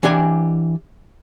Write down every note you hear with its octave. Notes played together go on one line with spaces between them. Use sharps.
E3 D4 G4 G#5